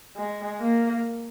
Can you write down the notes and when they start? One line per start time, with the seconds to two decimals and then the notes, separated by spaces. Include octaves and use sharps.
0.16 G#3
0.60 A#3